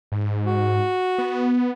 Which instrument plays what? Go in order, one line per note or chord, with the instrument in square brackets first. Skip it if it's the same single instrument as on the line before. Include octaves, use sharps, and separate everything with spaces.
[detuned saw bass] G#2
[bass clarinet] F#4
[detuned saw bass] B3